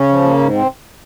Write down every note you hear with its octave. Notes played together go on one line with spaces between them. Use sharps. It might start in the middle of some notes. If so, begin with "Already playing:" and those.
Already playing: C#3 C#4
F3
A#3
G#2
C3 C4